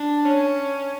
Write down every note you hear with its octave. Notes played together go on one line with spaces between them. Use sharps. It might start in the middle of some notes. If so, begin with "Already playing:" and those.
Already playing: D4
C#4